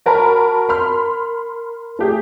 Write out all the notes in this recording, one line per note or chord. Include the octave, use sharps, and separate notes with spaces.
F#4 A#4 A5 B5
A#4 B5 C6 F6
A3 G4 G#4